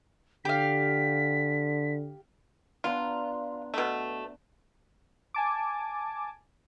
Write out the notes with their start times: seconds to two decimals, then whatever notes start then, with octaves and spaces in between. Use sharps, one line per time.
0.45 D3 G4 F5 B6
2.84 B3 D4 F4 A#5
3.74 B2 A3
5.34 G#5 A5 D6